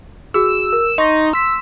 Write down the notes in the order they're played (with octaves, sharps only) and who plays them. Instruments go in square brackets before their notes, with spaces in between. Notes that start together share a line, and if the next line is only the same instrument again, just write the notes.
[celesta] F#4 G#4 [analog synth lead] E6
[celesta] A#4
[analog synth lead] D#4 [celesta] C6 C#6 A#6
[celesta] C6 B6 [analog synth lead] E6